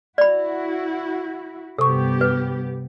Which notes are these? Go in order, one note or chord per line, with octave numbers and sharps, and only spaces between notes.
E4 F#4 D5 B5
G2 C3 B3 G4 A4 C#6
B4